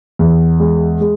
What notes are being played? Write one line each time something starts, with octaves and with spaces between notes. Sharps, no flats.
E2
G#3
G#3